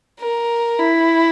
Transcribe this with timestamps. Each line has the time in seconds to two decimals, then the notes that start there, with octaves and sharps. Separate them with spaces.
0.20 A#4
0.79 E4